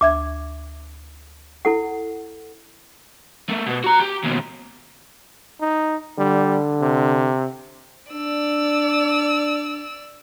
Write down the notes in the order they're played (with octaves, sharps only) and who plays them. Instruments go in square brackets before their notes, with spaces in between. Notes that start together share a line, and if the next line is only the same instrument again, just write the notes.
[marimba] D2 E5 G#6 [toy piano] D6
[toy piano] E4 A4 F#5
[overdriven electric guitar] A3 A#3
B2
F#4 A#5
G4
D#2 B2
[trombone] D#4
[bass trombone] D3 [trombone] G3
[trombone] C3
[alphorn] D4 [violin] D5 E6